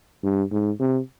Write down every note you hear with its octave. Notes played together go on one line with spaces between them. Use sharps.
G2
G#2
C3